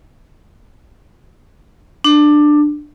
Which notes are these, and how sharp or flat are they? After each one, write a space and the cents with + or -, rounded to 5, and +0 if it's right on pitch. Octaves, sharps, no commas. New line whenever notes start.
D4 +15